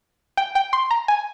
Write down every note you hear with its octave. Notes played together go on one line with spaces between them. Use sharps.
G5
G5
C6
A#5
G#5